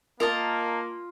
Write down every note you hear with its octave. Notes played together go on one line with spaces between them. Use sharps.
A#3 F4 A#4 D#5 A5